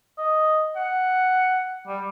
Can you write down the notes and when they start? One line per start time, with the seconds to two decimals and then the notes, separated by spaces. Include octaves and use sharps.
0.18 D#5
0.76 F#5
1.87 G3